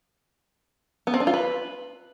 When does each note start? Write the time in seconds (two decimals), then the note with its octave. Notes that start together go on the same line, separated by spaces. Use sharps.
1.07 B3
1.14 C4
1.20 D4
1.27 F4
1.34 B4